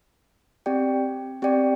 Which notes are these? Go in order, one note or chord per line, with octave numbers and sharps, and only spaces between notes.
C4 G4 D5 G5
C4 G4 D5 G5